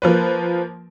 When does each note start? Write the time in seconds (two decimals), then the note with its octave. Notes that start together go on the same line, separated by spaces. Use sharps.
0.02 F3 A#3 B4